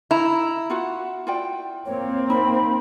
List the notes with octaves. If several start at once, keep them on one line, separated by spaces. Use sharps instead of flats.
E4 A#5
F4 F#4 F#5
F4 D5 G5
A#3 C4 C#5
D#4 B5